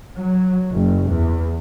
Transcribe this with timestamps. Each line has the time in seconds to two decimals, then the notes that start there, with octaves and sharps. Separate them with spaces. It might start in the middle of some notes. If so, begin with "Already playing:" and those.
0.16 F#3
0.74 F#1
1.09 E2